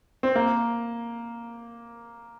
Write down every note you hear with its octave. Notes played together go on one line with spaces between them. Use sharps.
C4
A#3